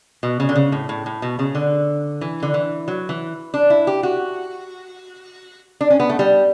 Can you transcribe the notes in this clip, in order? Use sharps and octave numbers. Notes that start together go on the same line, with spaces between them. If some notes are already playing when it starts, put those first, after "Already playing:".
B2
C#3
D3
C#3
A2
A2
A2
B2
C#3
D3
E3
D3
E3
F#3
E3
D4
E4
G4
F#4
D4
C#4
B3
A3
G3